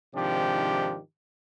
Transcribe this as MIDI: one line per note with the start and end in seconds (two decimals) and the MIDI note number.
0.14 0.98 44
0.14 0.98 48
0.14 0.98 51
0.14 0.98 53
0.14 0.98 62
0.14 0.98 67